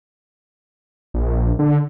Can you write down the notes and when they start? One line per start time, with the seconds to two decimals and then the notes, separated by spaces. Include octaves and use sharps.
1.14 A#1
1.59 D3